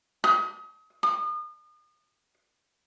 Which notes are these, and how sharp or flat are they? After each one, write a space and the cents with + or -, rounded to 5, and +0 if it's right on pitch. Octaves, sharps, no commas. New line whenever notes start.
D#6 +30
D#6 -40